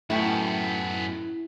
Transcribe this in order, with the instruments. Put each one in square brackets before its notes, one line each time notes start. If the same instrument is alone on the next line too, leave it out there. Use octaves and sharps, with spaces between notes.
[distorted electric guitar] F#2 B3 [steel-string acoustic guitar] A2 G5 [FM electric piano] E4